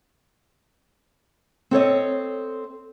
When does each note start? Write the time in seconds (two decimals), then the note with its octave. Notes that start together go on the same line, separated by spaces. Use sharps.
1.71 C4 A4 C#5 D#5